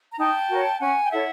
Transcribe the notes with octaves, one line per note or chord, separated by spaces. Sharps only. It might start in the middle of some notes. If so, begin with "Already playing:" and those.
A#5
D#4 G5 A5
F#4 A#4 C#5
C#4 F#5 G#5
G5
E4 A4 C#5 E5 F#5